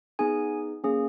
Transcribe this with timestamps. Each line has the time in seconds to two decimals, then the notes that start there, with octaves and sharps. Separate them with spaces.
0.19 B3 D#4 G#4 G#5
0.84 A#3 C#4 G#4